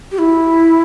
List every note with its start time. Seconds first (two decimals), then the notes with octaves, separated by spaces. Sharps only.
0.12 G4
0.19 E4